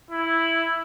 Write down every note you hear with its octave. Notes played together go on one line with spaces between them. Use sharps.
E4